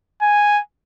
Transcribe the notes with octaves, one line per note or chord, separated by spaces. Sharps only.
G#5